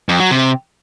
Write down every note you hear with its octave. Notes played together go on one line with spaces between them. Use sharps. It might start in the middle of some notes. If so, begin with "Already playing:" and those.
F2
F#3
C3